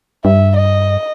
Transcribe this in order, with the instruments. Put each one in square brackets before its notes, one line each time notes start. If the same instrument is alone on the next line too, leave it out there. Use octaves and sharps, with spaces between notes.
[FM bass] G2 [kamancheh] E5
[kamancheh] D#5